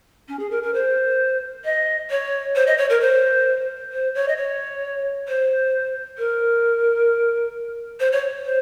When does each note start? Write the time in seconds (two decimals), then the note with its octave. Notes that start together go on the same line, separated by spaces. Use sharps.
0.28 C#4
0.39 G#4
0.51 A#4
0.63 A#4
0.74 C5
1.65 D#5
2.10 C#5
2.55 C5
2.67 D#5
2.78 C#5
2.90 A#4
3.01 C5
3.92 C5
4.15 C#5
4.28 D#5
4.37 C#5
5.28 C5
6.18 A#4
8.00 C5
8.12 C#5
8.45 C5